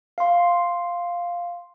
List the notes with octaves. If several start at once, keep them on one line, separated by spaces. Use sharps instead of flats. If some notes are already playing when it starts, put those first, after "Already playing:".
F5 C6